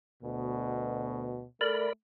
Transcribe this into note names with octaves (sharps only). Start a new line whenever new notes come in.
D2 B2
A3 A#4 D5 B5